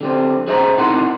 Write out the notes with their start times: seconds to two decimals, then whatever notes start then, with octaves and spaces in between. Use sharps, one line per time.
0.01 D3 G3 C4
0.47 G#4 C5 D#5 E5 F#5 A#5
0.78 C3 D#4 E4 A#4 F#5 C6